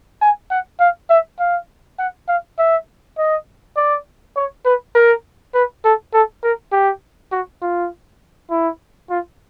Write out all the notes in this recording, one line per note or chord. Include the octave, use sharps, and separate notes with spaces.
G#5
F#5
F5
E5
F5
F#5
F5
E5
D#5
D5
C#5
B4
A#4
B4
A4
A4
A#4
G4
F#4
F4
E4
F4